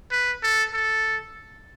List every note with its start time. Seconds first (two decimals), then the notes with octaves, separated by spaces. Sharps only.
0.11 B4
0.43 A4
0.74 A4